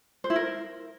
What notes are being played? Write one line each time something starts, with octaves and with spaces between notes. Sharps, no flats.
C5
E4
A#4